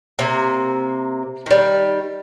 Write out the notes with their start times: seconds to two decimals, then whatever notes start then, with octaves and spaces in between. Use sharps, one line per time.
0.19 C3 A#3
1.46 D#3 G3